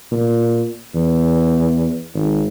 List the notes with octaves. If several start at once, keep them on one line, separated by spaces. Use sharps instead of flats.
A#2
E2
G#1